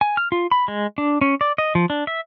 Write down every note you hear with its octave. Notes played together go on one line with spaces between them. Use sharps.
G#5
F6
F4
B5
G#3
D4
C#4
D5
D#5
F3
D4
E5